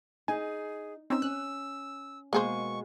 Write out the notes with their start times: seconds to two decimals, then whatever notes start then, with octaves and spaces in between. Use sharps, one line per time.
0.28 D#4 G#4 G#5
1.10 C4 C#4 D#4 E6
1.22 C#4 F#6
2.33 B2 G#3 A#3 G#4 C5 C#6